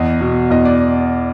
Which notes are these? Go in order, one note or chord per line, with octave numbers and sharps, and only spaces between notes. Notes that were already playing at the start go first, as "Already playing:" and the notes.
Already playing: E2 D#5
B2
E2 D#5
D5